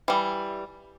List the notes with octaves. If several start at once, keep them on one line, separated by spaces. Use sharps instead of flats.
E3 G3